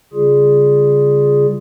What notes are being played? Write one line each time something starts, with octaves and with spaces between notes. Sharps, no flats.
C#3 G3 F4 G#4